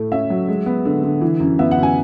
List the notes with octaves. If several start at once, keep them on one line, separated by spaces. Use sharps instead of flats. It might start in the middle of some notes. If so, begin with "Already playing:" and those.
Already playing: A2 A3
C#4 E5
F#3
G#3
B3
D3
D3
E3
F#2
B3 E5
F#5
F#2
G#5